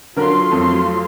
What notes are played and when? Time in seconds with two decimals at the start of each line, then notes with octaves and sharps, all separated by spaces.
0.16 D3 F#3 F4 A#4 C6
0.51 F2 A3